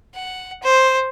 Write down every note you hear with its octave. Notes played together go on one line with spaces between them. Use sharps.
F#5
C5